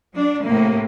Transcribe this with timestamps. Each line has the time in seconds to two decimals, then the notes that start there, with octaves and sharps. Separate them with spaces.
0.14 F#3 D4
0.46 A2 C3 A#3